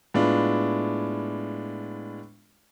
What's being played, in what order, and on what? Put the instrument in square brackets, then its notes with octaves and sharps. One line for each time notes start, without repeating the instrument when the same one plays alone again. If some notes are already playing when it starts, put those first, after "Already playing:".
[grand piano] A2 G#3 B3 D4 F4